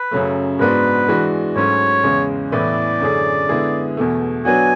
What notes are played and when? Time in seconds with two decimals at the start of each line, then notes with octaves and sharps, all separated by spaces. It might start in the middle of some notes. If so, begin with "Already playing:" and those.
Already playing: B4
0.11 F#2 C#3 F#3 A3
0.59 G#2 G#3 B3 D4 F#4 B4
1.08 E3 G#3 D4 F#4
1.56 G#2 F#3 A3 C#4 C#5
2.04 E2 C#3 G#3
2.52 A2 E3 B3 E4 B4 D5
3.00 F#2 D3 A3 C#4 G#4
3.49 D3 G#3 B3 E4 G#4
3.97 E2 B2 A3
4.45 F#3 B3 D4 F#4 G#5